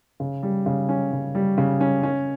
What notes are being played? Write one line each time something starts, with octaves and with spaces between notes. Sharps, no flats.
C#3
G3
C#3
C#4
C#3
G3
C#3
C#4
C#4